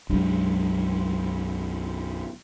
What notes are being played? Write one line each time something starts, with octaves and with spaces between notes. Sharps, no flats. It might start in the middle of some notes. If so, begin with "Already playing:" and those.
B1 F#2 G#3 D4